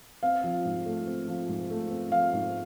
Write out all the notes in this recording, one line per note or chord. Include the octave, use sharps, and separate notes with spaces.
C4 F5
F3
G#2
A3
C4
F3
G#2
A3
C4
F3 F5
G#2